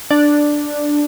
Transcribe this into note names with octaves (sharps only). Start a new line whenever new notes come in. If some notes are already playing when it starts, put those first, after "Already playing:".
D4